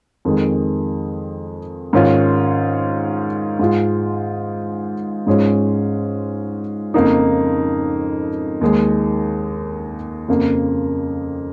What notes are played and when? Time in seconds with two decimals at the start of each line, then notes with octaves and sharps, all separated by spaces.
0.25 F2 D#3 G#3
1.93 G#2 D#3 C#4 F4
3.59 G#2 G#3 F4
5.27 G#2 G#3 C#4 F4
6.94 F2 C#3 A#3 D#4
8.61 D#2 D#3 G#3
10.28 F2 C#3 A#3